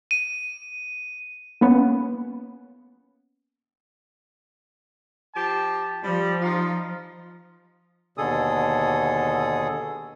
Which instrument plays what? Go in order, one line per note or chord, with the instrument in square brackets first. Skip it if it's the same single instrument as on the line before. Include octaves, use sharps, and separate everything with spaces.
[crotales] D#7
[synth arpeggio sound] A#3 B3 C#4
[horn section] F3 G4 A5
[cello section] F3 [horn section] G3
[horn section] D#4 F4
[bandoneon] D#2 B2 D3 G#4 A4 D#6